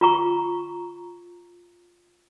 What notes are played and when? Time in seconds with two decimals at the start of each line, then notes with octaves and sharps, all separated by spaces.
0.01 F4 A#5 C#6